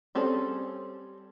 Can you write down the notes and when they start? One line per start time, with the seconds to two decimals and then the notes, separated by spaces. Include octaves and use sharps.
0.15 G3 C4 C#4 G#4 A4